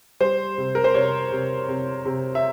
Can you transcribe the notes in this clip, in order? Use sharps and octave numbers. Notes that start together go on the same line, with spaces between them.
G3 C5
C3
A#4
C5
C3 C#5
C3
C3
C3
E5